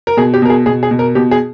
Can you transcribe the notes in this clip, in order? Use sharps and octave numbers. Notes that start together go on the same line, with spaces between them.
A#4
B2 G#4
G4
B2 A#4
G#4
B2 G#4
G#4
B2
A#4
B2 G4
G#4